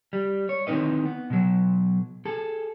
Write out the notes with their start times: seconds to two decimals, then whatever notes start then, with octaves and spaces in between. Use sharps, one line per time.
0.13 G3
0.49 C#5
0.67 D#3 E3 C4 D#4 B4 D#5
1.06 B3
1.30 B2 F#3
2.25 G#4 A4